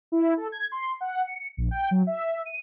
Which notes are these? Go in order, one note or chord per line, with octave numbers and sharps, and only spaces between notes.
E4
A4
G#6
C6
F#5
C#7
A#1
G5
F#3
E5
D#7